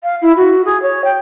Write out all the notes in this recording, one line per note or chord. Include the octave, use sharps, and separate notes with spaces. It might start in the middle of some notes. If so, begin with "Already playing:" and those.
F5
E4
F#4
G#4
C#5
G5